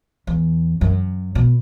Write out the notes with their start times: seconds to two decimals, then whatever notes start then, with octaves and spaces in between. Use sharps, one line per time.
0.27 E2
0.81 F#2
1.35 B2